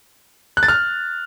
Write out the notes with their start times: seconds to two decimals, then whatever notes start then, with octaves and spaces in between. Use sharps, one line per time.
0.57 F#6
0.63 A6
0.68 F6